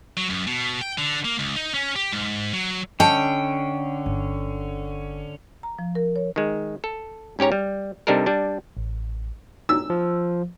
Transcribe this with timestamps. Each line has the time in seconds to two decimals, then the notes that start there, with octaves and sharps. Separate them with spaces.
0.17 F#3
0.29 F#2
0.47 B2
0.81 G5
0.98 D3
1.25 A#3
1.39 C#2
1.56 D#4
1.74 C#4
1.96 G4
2.13 G#2
2.54 F#3
3.00 D3 C#4 D#5 G5 A5
4.06 G1
5.63 A#5
5.79 F3
5.95 A#4
6.16 C#5
6.36 D#3 G#3
6.84 A4
7.39 G#2 C#4 G4 C#5 A#5
7.52 G3
8.07 C3 G3 D4 D#4 A4 A#4
8.26 G3 D4
8.77 A1
9.69 E6
9.90 F3